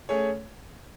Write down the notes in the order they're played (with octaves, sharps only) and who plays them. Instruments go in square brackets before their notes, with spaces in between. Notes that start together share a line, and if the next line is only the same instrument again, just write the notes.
[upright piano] A3 C#4 G#4 C#5